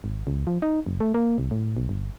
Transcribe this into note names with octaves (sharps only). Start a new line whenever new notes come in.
G#1
C#2
F3
D#4
F#1
A3
A#3
C2
A2
B1
G1